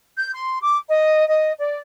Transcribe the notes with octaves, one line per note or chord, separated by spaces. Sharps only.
G6
C6
D6
D#5
D#5
D5